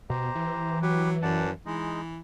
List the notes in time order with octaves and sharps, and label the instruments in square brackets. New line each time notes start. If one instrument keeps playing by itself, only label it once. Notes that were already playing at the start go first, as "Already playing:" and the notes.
[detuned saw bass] B2 [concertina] G4 C5 A#5
[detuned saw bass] E3
[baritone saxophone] F#3 [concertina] G4 B4
[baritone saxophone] F#2 [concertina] D5 F#5 A5
[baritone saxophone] E3 [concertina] G#3 D#4